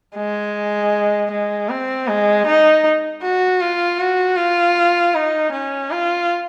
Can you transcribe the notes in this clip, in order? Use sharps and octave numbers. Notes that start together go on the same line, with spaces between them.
G#3
G#3
C4
G#3
D#4
F#4
F4
F#4
F4
D#4
C#4
F4